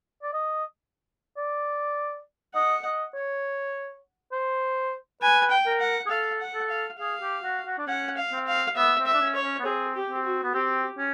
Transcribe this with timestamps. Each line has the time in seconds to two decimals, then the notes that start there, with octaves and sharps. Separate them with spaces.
0.23 D5
0.33 D#5
1.37 D5
2.55 D#5 F#5
2.85 D#5
3.14 C#5
4.32 C5
5.22 B4 G#5
5.51 G5
5.66 A#4
5.80 F#5
6.06 G#4
6.10 A4 F5
6.40 F#5
6.54 A4
6.70 F5
6.99 G#4 F5
7.22 G4
7.43 F#4
7.66 F#4
7.78 D4
7.87 C#4 F#5
8.17 F5
8.32 C4
8.47 F5
8.76 B3 E5
8.99 C4
9.06 E5
9.14 D4
9.21 C#4
9.35 C#5
9.43 C#4
9.59 B3
9.65 C4 G#4
9.95 G4
10.10 C4
10.25 F#4
10.43 B3
10.54 C4 G4
10.98 C#4